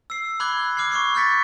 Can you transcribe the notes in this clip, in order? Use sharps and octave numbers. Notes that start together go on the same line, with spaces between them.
E6 C7
B5 D6 F#6 G#6 G7
D6 F6 G#6 C7
C#6 D6 C7
C#6 F6 G6 A6 B6 C#7